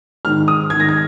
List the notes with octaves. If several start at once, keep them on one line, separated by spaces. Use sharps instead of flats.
G#2 D#3 F6
D#6
G#2 D#3 G#6
A#6
G#6